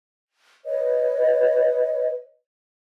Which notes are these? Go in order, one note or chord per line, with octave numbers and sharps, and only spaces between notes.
B4 C#5 D#5